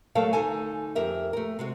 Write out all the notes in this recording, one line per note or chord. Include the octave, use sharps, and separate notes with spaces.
F#3 G3 A3 A4 A#4 F5
D2 D#4 A4 G#5
F2 G4 A#4 E5
A3 A#4
C3 G#3 F#4